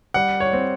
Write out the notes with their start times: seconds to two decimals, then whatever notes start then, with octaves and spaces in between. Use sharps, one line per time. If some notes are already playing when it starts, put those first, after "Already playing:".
0.14 G3 F#5
0.40 C#5
0.53 C4